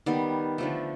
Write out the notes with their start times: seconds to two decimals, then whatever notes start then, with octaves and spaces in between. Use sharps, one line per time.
0.06 D#3 G3 B3
0.58 D3 F3 A3